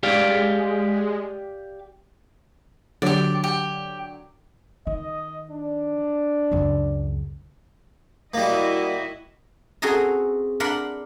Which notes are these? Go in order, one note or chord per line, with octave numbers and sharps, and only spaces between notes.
G#3 G4 D5 F5
D3 F#3 G4 D5
G4
D#3 D#5
D4
C#2 F#2
G3 A#3 E4 F#4 D#5
C4 C#4 F#4 G#4 A4 A#5
D4 A#4 F#5 B5 C6